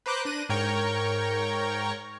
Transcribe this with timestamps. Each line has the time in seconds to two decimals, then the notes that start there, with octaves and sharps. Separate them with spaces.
0.06 B4 C5 A#5 D6 F#6 G6
0.25 D4 F#6 A#6 D#7
0.49 G#2 A#4 C#5 G5 A#5 C#6